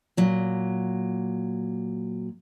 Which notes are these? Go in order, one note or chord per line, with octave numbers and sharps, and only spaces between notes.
A#2 F#3